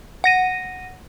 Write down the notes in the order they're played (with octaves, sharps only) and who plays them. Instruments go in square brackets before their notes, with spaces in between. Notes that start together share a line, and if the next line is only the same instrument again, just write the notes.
[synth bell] F#5 A#6 D#7